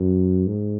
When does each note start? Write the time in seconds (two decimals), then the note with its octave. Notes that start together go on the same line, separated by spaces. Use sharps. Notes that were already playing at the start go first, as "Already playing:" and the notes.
Already playing: F#2
0.47 G#2